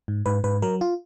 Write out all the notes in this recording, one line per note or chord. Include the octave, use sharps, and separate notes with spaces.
G#2
G#2 B4
G#2 B4
F#3 A#4
F4